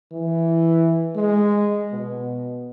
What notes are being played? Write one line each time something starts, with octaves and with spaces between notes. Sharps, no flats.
E3
G#3
B2